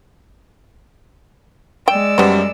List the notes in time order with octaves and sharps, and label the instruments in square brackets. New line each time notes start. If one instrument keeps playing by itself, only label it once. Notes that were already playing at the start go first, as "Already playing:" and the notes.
[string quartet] G#3 D5 E6 [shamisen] G5
[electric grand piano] F#2 G3 [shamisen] B3 C5